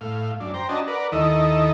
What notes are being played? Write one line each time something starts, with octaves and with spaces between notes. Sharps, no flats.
A2 F5
F#2 D4
C5 G5 A#5
C#4 D4 F#4 D#5 A5 A#5
A#4 B4 D5 F#5
D#2 D#3 E4 A4 D#5